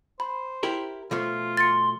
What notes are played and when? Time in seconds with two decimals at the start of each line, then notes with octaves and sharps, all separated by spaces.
0.20 C5 B5
0.63 E4 G4 A#4
1.11 B2 F3 A3 F4
1.57 C6 A6 C#7